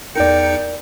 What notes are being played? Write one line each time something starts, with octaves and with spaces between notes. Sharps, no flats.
E2 D#4 A#4 D5 G5 C#7